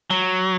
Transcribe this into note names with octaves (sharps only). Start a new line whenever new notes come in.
F#3